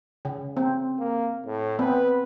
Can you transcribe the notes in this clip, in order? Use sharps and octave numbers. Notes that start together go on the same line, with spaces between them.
C#3
C4
A#3
A2
B3 C4 B4